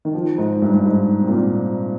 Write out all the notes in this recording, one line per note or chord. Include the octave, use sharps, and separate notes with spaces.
D#3
F3
G#2
G2
G2
G#2
C3
A#2